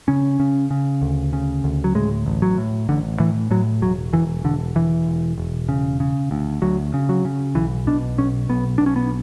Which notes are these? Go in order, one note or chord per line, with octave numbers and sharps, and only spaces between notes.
C#3 C#4
C#3
C#3
D2
C#3
D2
F#3
A2 G#3
A1
F#3
A2
A1 D3
A2 E3
A2 F#3
E1 F#3
E1 E3
E1 D3
E1 E3
E1
E1
C#3
C#3
D2
D2 F#3
C#3
F#3
C#3
B1 E3
B2 D4
B1 C#4
B1 B3
B1 D4
C#4
B3